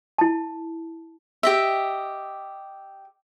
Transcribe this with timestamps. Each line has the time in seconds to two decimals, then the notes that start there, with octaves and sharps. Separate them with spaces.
0.18 E4 A5
1.43 G4 D#5 E5